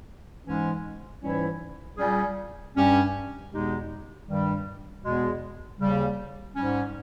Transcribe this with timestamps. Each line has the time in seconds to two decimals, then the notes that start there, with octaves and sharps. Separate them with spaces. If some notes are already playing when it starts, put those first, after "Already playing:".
0.45 G#2 E3 G#3 C#4
1.22 G#2 E3 G3 C#4 E4
1.98 A#2 G3 C#4 G#4
2.74 G2 G3 C#4 G4
3.51 E2 B2 G#3 D#4 G4
4.28 G2 D#3 G3
5.04 E2 B2 G#3
5.79 D#2 C#3 G3
6.56 G#2 G3 C#4